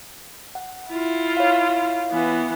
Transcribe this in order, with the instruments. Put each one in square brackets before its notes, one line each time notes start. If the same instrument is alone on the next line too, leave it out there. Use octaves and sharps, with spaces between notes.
[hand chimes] F#5
[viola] E4 F4
[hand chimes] C#5 F5
[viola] E3 B3